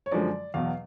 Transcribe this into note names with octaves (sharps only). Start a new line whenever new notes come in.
C#5
F#2 D3 F3 G#3 D5
E2 B2 F#3 F5